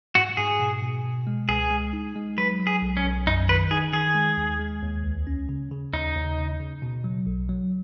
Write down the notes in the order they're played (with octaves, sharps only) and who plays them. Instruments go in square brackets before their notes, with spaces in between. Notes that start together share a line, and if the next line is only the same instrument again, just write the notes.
[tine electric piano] G#2 [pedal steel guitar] F#4
[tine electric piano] G#2 [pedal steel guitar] G#4
[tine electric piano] B2
B2
B2
G#3
[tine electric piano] C#2 [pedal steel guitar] G#4
[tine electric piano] G#3
D#4
G#3
[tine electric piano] F#3 [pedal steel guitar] B4
[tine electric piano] F#3
[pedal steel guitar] G#4
[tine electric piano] B1
[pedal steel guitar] C#4
[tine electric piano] B1
[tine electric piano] F#2 [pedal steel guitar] D#4
[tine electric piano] D#3 [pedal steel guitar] B4
[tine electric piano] D#4 [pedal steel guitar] G#4
[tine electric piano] D#3 [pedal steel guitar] G#4
[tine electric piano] G#3
D#2
G#3
D#2
C#2
C#4
C#3
C#3
[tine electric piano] D#2 [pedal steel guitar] D#4
[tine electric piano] D#2
C#3
C#3
B2
F#3
B1
F#3